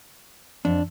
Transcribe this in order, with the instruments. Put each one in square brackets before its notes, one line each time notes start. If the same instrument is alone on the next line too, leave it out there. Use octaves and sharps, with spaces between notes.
[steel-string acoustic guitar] F2 [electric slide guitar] D4